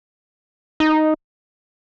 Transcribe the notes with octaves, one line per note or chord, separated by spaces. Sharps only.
D#4